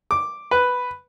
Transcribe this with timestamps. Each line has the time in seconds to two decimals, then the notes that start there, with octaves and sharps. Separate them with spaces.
0.11 D6
0.51 B4